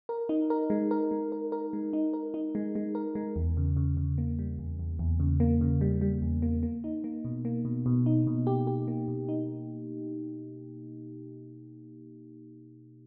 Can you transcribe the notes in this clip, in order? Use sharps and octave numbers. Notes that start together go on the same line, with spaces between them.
A#4
D#4
A#4
G#3
A#4
G#3
A#4
A#4
G#3
D#4
A#4
D#4
G#3
G#3
A#4
G#3
E2
C#3
C#3
C#3
A#3
G3
E2
E2
E2
C#3
A#3
C#3
G3
G3
E2
A#3
A#3
D#4
A#3
B2
A#3
B2
B2
D#4
B2
G4
G4
A#3
B2
D#4